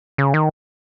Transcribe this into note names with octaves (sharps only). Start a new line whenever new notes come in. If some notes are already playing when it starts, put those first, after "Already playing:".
C#3
D#3